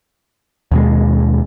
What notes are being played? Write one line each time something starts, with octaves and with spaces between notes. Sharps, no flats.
D#2 B2 G#3